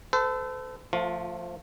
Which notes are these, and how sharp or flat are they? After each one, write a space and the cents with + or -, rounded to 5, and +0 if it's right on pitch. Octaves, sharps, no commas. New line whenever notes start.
A4 +0 C5 -45
F3 +0 A3 +30 F4 +25